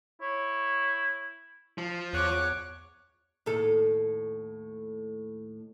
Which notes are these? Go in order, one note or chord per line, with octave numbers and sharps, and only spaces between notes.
E4 C#5
F3
E2 C#5 D6 F#6
D#2 A2 A4